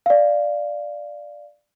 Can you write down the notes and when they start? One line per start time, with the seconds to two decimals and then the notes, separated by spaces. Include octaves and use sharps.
0.06 D5 F5